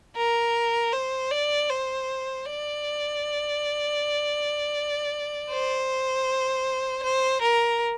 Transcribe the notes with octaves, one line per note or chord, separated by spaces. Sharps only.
A#4
C5
D5
C5
D5
C5
C5
A#4